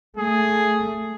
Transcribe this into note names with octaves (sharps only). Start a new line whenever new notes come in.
A3 G#4